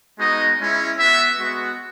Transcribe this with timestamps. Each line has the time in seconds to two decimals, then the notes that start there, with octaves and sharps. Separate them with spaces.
0.19 G#3 B3 D#4 F#4 D#5
0.59 G#3 C#4 E4
0.99 B3 F#4 E5
1.39 G#3 B3 F#4